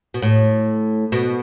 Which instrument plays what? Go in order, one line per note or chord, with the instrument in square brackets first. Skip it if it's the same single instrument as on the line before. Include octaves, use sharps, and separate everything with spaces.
[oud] B2
A2
B2